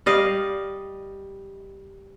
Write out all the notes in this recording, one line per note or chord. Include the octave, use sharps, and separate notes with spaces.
G3 D#5 F5